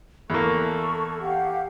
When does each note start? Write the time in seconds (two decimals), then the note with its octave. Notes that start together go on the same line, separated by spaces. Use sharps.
0.30 E2 A#3 A4 A5 C#6
1.21 G4 F5 F#5